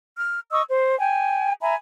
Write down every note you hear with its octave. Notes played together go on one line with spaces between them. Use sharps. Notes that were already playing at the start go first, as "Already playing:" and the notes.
F6
D#5 C#6 D#6 E6
C5
G5 G#5
E5 G#5 A#5 B5